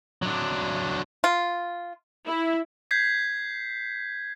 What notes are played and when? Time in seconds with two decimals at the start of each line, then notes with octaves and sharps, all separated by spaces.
0.22 F#3 D4
1.24 F4
2.27 E4
2.91 G6 G#6 B6 C7